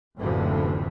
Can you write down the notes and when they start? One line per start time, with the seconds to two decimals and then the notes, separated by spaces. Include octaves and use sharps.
0.17 F#1 D2 A2 C3 E3 F3